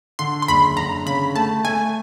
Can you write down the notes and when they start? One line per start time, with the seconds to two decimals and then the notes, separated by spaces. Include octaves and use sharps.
0.19 D3 C6
0.42 C6
0.48 F#1 B5
0.77 D3 A#5
1.06 C#3 B5
1.35 A3 A5
1.64 A3 G#5